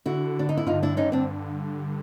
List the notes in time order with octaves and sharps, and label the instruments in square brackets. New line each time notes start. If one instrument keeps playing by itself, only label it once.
[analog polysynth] D3 [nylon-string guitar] E4 F#4
[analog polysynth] D3 [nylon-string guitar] D4
[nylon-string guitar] D#4
E4
[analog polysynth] G2 [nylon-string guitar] D#4 F4
[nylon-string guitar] D4 E4
[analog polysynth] D3 [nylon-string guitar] C#4 D#4
[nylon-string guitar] C4 D4